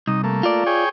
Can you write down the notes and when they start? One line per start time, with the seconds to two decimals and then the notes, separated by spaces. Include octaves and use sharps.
0.07 C2 D#4
0.24 A3 A#3
0.43 F4 D5
0.66 G#4 C#5 G5